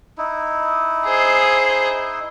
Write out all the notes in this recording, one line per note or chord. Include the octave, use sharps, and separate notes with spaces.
D#4 E4
G#4 C5